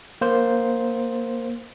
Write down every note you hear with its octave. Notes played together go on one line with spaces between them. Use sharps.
A#3 C5